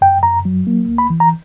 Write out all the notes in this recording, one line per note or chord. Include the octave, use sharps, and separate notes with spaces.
F#2 G5
F#2 A#5
F#3
A#3
C#2
B5
E3
A#5